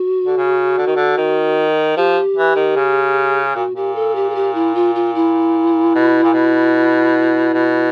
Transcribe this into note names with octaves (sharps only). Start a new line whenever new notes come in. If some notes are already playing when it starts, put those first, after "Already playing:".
Already playing: F#4
D3
C#3
D3
D#3
D3
D#3
F3 G4
E3
D#3
C#3
A#2 F#4
A#2 G4
A4
G4
G#4
G4
E4
F4
F4
E4
B2
A#2
B2
B2